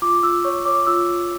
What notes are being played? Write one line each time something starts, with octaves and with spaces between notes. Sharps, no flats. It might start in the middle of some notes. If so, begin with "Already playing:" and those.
F4 D6
F4 E6
C#5 C#6
C#5 D6
F4 E6
F4